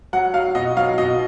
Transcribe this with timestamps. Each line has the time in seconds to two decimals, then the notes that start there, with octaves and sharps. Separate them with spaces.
0.13 F#3 F#5
0.34 F#3 F5
0.55 B2 D#5
0.77 F#3 F5
0.98 B2 D#5